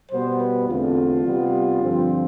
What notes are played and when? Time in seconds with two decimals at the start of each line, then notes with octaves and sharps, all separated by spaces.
0.11 B2 G3 B3 C5
0.39 B4
0.68 E2 D3 A3 C4 F4
1.24 C3 G3 B3
1.81 G2 D3 F3 C4